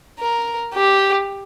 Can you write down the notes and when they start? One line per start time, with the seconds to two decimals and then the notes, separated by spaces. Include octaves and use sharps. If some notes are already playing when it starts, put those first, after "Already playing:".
0.20 A#4
0.74 G4